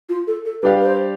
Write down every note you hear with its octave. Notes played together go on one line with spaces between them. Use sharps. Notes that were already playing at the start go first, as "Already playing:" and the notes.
F4
A4
A4
G3 D4 G4 B4 D5 F5
B4
C5